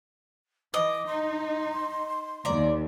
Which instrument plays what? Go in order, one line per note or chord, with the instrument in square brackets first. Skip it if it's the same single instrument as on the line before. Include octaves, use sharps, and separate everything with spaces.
[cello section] E3 [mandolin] D#5 [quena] D6
[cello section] D#4 [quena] C6
[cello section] D#2 [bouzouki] A#4 D5